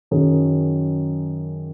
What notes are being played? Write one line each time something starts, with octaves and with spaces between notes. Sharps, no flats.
F#2 D#3 F#3 C#4 G#4